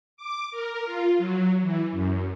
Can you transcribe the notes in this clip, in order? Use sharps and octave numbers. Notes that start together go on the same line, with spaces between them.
D6
A#4
F4
F#3
E3
F#2